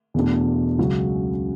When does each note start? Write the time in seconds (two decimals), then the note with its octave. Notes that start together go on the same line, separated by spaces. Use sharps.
0.14 E2 B2 A3 D4
0.78 C#2 C#3 F#3